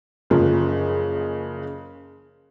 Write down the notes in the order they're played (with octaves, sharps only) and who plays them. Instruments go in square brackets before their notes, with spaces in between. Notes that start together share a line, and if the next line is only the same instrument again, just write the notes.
[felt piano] F#1 C#3 F3